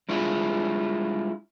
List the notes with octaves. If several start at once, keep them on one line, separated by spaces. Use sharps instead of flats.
G3 G#3 D4 E4 F4 G#4